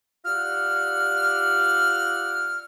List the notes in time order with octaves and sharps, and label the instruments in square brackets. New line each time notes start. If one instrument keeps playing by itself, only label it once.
[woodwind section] F4 G4 D5 F#5 E6 F6